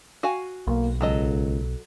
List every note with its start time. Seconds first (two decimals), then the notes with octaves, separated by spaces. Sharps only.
0.23 F#4 F5 G#5
0.67 B1 A#3
1.01 C#2 F#3 A4 D#5